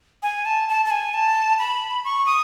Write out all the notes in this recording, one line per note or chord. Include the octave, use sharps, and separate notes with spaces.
G#5
A5
A5
A5
G#5
A5
B5
C#6
D#6